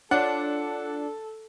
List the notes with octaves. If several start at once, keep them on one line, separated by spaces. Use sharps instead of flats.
D4 F4 A4 C#5 D5 F#5